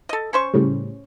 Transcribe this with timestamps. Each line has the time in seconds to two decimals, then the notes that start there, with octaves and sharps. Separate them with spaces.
0.09 A4 D#5
0.33 C#4 C5 C#6
0.54 A2 C#3 G3